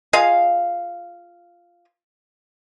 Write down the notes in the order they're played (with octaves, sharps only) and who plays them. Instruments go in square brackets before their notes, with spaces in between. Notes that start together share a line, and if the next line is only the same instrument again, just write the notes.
[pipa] F4 G#4 D#5 F5